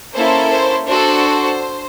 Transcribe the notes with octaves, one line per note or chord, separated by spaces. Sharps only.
A#3 C#4 E4 A4 C5
C5
D4 F#4 A4 C5